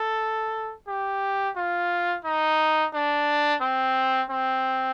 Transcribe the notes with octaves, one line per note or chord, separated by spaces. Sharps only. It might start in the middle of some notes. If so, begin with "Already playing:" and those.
Already playing: A4
G4
F4
D#4
D4
C4
C4